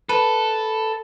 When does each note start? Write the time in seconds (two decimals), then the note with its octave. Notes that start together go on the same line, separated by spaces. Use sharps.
0.09 A4 B4